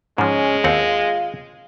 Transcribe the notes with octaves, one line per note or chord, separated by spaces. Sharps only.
G#2 F3 G#3 C#4
D#2 C4 F4 F#5